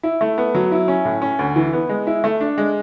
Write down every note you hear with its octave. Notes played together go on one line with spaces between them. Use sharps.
E4
A3
B3
F#3
E4
C#4
A2
C#4
D2
E3
B3
G#3
E4
A3
D4
G#3